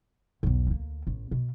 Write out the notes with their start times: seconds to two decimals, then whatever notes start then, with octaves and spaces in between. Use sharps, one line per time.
0.43 B1 E2
0.67 D2 A#3
1.07 A1
1.31 B2